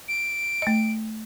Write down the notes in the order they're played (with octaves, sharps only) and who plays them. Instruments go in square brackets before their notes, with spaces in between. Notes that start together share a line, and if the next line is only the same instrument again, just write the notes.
[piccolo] D7
[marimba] A3 D#5